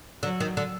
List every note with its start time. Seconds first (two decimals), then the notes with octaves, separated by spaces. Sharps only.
0.23 D3 F#3
0.40 D#3
0.57 D3